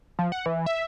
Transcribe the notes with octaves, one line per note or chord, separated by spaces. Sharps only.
F3
F#5
E3
E5